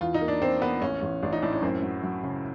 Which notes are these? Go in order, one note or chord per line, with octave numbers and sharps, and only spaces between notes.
E2 F4
D#4
A#3
D4
A#3 C4
A#3 B3
A1 C#4
A1
A1 D4
D#4
A2 D4
C#4
F#2 C4
F#3
F#3
C#3